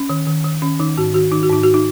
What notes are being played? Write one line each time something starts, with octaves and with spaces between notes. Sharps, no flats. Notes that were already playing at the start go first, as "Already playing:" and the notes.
Already playing: C#4
D#3
D#3
D#3
D#3 C#4
D#3 D#4
G#2 F#4
D#3 F#4
D#3 D#4
F#4
G#2 D#4
F#4
D#4